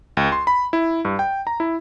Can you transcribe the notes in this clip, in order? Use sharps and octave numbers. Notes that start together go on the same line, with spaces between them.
C#2
C6
B5
E4
G2
G5
A#5
E4